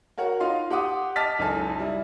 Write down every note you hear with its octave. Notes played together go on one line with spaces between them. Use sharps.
F#4 A#4 C#5 F#5
D#4 F4 F5 C6
G4 F#5 C6 D6 D#6
D#5 A5 D6 F6 A6 B6
F#1 C#2 D#4 A4 G#5 A5
G3 E4